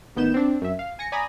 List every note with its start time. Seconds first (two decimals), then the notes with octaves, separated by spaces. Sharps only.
0.16 A1 D#3 B3 G6 E7
0.34 C4 D4
0.62 F#2 E5
0.79 F5
0.99 G#5 A#6 C#7
1.12 D5 G#5 A#5 B5 D#6 A#6